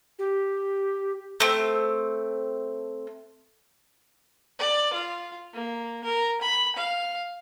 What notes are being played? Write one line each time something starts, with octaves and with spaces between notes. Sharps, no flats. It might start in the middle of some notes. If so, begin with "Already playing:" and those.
G4
A3 C4
D5
F4
A#3
A#4
B5
F5